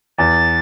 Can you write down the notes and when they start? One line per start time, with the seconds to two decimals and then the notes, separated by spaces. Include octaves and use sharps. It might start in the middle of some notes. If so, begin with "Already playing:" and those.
0.18 E2 A6